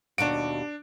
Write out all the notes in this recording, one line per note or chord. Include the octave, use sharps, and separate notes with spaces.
D#2 B2 D4 F#4 D7